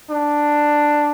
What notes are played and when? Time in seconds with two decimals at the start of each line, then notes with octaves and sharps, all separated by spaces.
0.11 D4